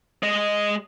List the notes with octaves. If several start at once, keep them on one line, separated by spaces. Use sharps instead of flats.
G#3 D#5